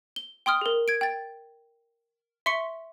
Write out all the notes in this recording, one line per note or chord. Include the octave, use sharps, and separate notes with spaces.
G7
G5 C6 D#6 F6
G#4 A#4
G#6 D7
G5 A6
E5 C6 C#6 B6 C#7